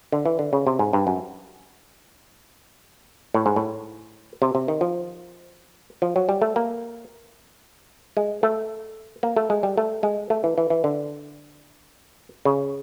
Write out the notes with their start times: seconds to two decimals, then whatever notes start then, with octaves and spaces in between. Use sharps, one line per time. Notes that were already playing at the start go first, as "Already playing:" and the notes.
0.12 D3
0.26 E3
0.39 D3
0.53 C#3
0.67 C3
0.79 G#2
0.93 G2
1.07 F#2
3.34 A2
3.46 G#2
3.56 A2
4.42 C3
4.55 C3
4.68 D#3
4.81 F3
6.02 F3
6.16 F#3
6.29 G3
6.42 A3
6.56 A#3
8.17 G#3
8.43 A3
9.23 A#3
9.36 A3
9.50 G#3
9.63 G3
9.77 A3
10.03 G#3
10.30 A3
10.44 E3
10.58 E3
10.70 E3
10.84 D3
12.45 C#3